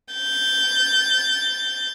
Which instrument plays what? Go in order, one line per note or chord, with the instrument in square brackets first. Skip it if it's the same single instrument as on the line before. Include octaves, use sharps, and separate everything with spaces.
[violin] G6 A6